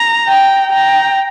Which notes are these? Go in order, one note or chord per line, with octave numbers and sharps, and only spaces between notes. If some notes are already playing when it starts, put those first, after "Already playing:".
Already playing: A#5
G5
G5 A#5